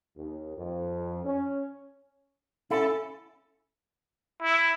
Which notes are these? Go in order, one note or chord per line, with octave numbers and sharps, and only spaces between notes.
D#2
F2
C#4
C#4 E4 A4
E4